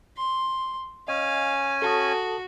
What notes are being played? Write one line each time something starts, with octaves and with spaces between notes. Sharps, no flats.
C6
C#4 D#5 F5 G#5
F#4 A4 A5 D#6